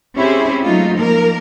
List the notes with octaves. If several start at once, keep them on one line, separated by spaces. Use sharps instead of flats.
C4 C#4 E4 G4 G#4 C5
F#3 G#3 A3 D#4 F4
F3 A#3 A#4